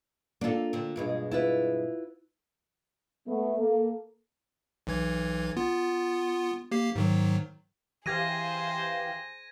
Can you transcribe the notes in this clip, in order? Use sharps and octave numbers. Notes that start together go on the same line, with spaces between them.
A#3 D4 F4 A4
D3 C4
G2 B2 G#3
E4 F4 B4
A3 B3
A#3 A4
B1 E3 G#6
B3 F4
A#3 G4 C7
G#2 D#3 F#3
E3 G4 G#4 C5 F5 G#6 A#6 D#7